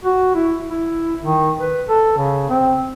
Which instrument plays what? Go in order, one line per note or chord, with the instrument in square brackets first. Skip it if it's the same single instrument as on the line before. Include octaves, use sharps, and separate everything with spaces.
[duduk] F#4
E4
E4
D#3
B4
A4
C#3
C4